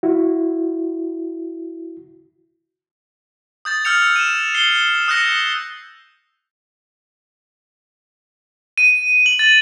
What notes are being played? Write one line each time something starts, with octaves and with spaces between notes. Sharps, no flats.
E4 F#4
D#6 G6 A6
E6 F6 G6 C#7 F7
D#7 E7
C7 G7
D#6 F#6 G6 A#6 C#7
D#7
F#7
A6